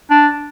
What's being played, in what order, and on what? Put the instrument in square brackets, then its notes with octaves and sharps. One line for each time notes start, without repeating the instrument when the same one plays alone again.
[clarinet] D4